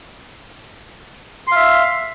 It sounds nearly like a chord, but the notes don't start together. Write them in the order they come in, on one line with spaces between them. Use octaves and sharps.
C6 F5 E5